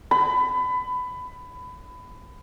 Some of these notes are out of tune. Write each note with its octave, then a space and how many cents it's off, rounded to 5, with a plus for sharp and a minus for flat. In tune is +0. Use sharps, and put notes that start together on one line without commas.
B5 +20